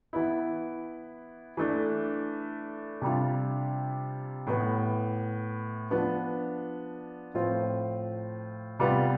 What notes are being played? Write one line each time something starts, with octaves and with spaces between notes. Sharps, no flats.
E3 B3 E4
E3 A3 D4
C3 G3 D4 F4
A2 E3 B3
F3 B3 D4
A2 F3 C4 F4
C3 G3 B3 F4